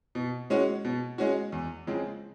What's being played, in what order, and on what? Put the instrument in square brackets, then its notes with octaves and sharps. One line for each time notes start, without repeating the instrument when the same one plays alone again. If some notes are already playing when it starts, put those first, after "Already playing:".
[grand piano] B2
G#3 C#4 F#4
B2
G#3 C#4 F#4
E2
C#3 F3 G#3 C4